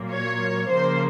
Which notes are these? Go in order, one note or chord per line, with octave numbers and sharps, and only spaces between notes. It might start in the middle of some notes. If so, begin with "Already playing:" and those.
Already playing: A#2 F#3 A#3
C#5
C#3 F3 A#3 C5